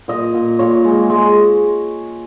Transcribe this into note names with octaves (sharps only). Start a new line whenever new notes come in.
A#2 D#5
A#2
A#2 C#5
G#3
G#3